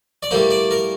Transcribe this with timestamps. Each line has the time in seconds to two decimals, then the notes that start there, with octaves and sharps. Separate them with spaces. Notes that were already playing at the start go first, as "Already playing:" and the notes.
0.23 D5
0.31 A2 G3 A#3 C5
0.51 D5
0.71 A#4